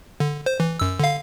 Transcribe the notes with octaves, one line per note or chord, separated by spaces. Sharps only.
D3
C5
E3
F#2 E6
D3 F5